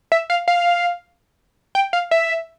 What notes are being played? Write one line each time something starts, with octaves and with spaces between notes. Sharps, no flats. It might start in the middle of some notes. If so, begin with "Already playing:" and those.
E5
F5
F5
G5
F5
E5